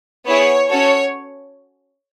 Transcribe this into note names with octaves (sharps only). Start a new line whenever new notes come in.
B3 E4 G#4 C#5
C#4 F#4 A4 C#5